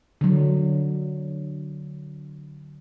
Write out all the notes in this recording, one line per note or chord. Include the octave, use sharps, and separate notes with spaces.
D3 F#3